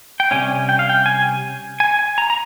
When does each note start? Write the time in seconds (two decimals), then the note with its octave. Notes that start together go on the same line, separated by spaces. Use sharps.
0.20 G5
0.31 C3 G3 C#4 G#5
0.69 G5
0.79 F5
0.89 G5
1.06 G#5
1.80 G#5
1.99 G#5
2.18 A#5
2.30 A#5